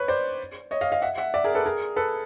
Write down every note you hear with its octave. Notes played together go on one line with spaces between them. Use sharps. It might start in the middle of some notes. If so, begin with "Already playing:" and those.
Already playing: B4 C#5
C5 D5
C#5 D#5
D#5 F5
D#5 F5
E5 F#5
E5 F#5
D5 E5
G#4 A#4
A4 B4
G#4 A#4
A4 B4